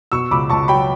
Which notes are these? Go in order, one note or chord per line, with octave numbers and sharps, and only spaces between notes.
B2 C#6 E6
C#2 B5 D6
C#2 A5 C#6
F#3 G5 B5